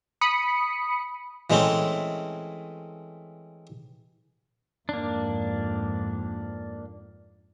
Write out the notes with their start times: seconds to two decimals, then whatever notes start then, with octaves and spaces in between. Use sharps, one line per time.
0.21 B5 D#6 C#7
1.50 E3 G#3 A3 C4 C#4
4.89 F2 G#2 A#3 D4